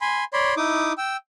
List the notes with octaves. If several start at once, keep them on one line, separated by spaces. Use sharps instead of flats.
G#5 B5 C6
C#5 D5 B5 C6
D#4 E4 D6 D#6
G5 E6